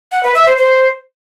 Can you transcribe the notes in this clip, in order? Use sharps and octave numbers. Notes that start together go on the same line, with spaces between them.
F#5
B4
E5
C5
C5